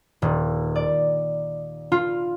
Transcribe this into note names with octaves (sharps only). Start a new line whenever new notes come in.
D#1
D5
F4